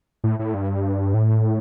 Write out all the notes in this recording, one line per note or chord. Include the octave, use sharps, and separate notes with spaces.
A2
A2
G2
A2